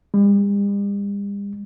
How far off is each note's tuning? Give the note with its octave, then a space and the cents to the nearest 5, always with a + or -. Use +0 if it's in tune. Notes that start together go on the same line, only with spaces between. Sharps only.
G3 +45